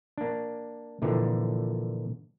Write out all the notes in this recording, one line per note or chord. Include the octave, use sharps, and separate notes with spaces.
A#3 D4
A#2 D3 E3 F3